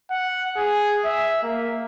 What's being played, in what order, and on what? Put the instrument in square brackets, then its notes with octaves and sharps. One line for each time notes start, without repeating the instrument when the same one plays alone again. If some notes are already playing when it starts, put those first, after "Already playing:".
[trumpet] F#5
G#4
E5
A#3